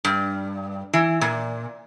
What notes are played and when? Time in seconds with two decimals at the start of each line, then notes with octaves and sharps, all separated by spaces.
0.05 G2
0.93 E3
1.21 A#2